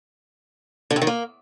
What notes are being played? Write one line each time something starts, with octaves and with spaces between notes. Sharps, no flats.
D3
C3
D#3
A#3